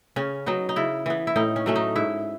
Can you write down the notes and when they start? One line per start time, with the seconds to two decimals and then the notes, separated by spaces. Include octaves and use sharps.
0.16 C#3 C#4
0.46 F#3 B3 D#4
0.69 D#4
0.76 C#3 E4
1.06 E3 B3
1.27 E4
1.36 A2 D#4
1.56 C#4
1.66 F#3 A3 C#4
1.76 D#4
1.96 G#2 E4